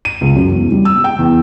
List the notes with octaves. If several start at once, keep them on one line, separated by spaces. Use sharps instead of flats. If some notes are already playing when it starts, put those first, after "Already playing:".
D#7
C#2
F#2
E2
G3
E6
G5
E2